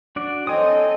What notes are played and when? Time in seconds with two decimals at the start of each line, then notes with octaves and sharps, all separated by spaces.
0.16 D4 F#4 D5
0.47 C4 A4 C#5 D#5 G#5 D#6